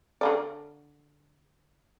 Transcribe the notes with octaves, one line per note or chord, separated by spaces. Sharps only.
D3 A3 D5